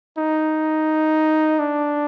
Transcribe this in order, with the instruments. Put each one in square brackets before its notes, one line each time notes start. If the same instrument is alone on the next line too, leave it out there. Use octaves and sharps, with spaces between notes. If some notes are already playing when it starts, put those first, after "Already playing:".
[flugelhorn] D#4
D4